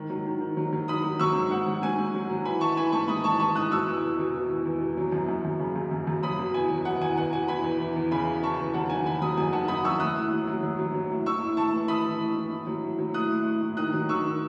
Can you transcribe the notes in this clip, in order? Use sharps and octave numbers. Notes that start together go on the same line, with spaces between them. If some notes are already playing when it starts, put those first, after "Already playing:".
Already playing: G#2 D#3
F#3
D#3
D#3
F#3
F#3
D#3 B5 D#6
F#3
F#3 C#6 E6
G#2
G#2 F#5
F#3
G#2 G#5
G#2
F#3
F#3
E3 G#5 B5
E3 A5 C#6
E3 G#5 B5
G#2 A5 C#6
G#2 B5 D#6
E3 A5 C#6
E3 A5 C#6
G#2 D#6 F#6
B2 C#6 E6
E2
E2
B2
B2
E2
E2
B2
F#3
F#2
F#2
F#2
C#3
F#2
F#2
F#2
F#3 B5 D#6
B2
E2 G#5
F#3
B2 F#5
E2 G#5
E2 F#5
B2 G#5
E2 G#5 B5
E2
E3
E2
C#3 G#5 B5
E3
C#3 A5 C#6
E2
F#3 F#5 A5
D#3 G#5
F#3 G#5 B5
F#3 B5 D#6
F#2 G#5
D#3 F#5 A5
F#2 B5 D#6
F#2 C#6 E6
A2 D#6 F#6
A2
F#3
F#3
F#3
F#3
F#3
A2
A2 C#6 E6
A2
A2 A5 C#6
E3
E3 B5 D#6
E3
A2
A2
A2
F#3
A2
F#3
A2 D#6 F#6
A2
A2
A2
D#3 D#6 F#6
F#3
D#3 C#6 E6
D#3